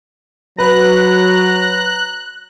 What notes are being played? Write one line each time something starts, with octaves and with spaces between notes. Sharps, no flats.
F#3 B4 A#5 F#6